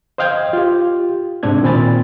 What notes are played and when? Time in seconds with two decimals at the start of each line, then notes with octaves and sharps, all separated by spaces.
0.18 C5 D#5 F5 G5 G6 G#6
0.53 F4 G4
1.43 G#2 C3 C4 D4 G#6
1.62 A#2 D#3 C4 G#5 B5 A6